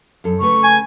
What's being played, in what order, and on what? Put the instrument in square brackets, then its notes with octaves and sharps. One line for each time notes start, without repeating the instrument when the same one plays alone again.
[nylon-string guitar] F#2 A4
[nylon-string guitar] C#3 A3 B4 [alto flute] C#6
[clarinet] G#5